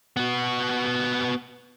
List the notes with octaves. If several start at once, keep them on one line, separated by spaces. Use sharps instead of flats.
B3 F#4